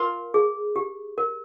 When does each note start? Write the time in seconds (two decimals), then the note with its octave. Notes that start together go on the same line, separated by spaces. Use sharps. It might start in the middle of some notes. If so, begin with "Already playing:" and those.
Already playing: F4 A#4
0.34 G#4
0.76 G4
1.18 A#4